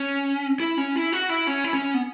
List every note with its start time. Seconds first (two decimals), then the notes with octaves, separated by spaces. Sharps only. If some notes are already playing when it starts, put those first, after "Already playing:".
Already playing: C#4
0.60 E4
0.78 C#4
0.96 E4
1.12 F#4
1.29 E4
1.47 C#4
1.64 E4
1.73 C#4
1.94 B3